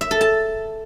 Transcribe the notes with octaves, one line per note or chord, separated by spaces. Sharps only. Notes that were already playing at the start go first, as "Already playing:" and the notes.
E5
A4
A5